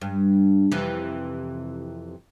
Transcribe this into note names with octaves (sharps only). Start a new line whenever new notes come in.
G2
F2 C3 E3